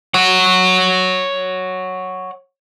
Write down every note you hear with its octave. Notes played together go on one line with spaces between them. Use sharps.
C#5 F#5